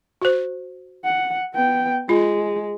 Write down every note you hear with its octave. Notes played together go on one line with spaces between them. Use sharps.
F#4 C5
F#5
B3 G5
G#3 F4